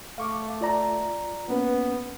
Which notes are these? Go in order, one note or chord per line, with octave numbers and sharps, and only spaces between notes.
A3 F5 C#6 D6
F4 D5 A#5
A#3 B3 C#4 B4